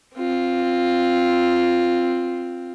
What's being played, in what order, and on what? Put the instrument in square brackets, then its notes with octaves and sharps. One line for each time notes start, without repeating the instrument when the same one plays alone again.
[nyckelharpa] C4 F4